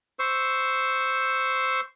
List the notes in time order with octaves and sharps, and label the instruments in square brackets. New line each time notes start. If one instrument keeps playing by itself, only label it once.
[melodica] C5 C#6 E6